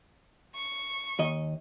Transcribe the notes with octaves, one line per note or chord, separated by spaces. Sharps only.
C#6
D#2 D#5